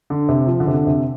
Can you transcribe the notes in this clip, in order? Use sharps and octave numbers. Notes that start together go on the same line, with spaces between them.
D3
C3
F3
D3
C3
D3
C3